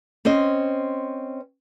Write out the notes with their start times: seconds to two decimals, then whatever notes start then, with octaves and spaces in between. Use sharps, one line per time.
0.25 C4 C#4 C5 D#5